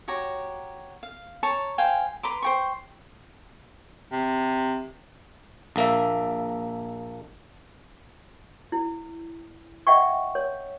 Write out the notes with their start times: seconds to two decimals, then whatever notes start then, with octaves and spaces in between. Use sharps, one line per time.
0.08 F#4 G4 C#5 A#5
1.03 F5
1.43 C#5 A5 A#5 C#6
1.78 C5 F5 G5 G#5
2.23 B4 A#5 C6 D6
2.42 C5 G5 C#6
4.12 C3
5.76 A#1 A#3 E5
8.72 E4
9.87 D#5 E5 F#5 G5 C#6
10.35 C#5